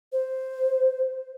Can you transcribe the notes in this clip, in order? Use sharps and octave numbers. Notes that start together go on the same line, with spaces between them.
C5